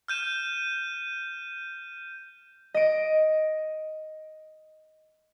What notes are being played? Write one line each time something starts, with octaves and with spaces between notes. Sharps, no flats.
F6 G6 D#7 E7
D#5 D7